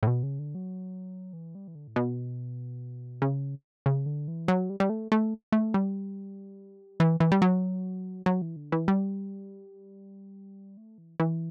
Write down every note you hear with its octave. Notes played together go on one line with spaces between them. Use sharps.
A2
B2
C#3
D3
F#3
E3
G3
E3
D3
A2
B2
C#3
C#3
D3
E3
F#3
G3
G3
A3
A3
A3
G3
E3
E3
G3
F#3
F#3
E3
D3
E3
G3
A3
E3
E3